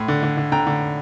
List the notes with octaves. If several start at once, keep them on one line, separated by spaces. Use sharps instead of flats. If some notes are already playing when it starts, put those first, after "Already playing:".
Already playing: A2 C6
D3
D3
D3
D3 G5 A#5
D3